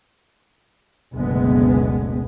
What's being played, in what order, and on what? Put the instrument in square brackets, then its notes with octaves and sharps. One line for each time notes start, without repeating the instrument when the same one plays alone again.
[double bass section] F#1 D2 B2 G#3 B3